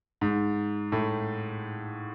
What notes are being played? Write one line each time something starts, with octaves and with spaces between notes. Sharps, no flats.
G#2
A2